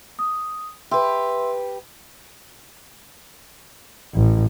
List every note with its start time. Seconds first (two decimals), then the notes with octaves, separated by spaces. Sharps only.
0.19 D#6
0.91 G4 B4 E5 C6 E6
4.14 A1